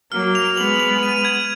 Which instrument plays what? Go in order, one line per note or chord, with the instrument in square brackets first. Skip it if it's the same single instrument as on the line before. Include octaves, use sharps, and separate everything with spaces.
[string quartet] F#3 A#3 [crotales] F6
[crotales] F7
[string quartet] G#3 B3 [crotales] F#7
[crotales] F#7
D#7
G#6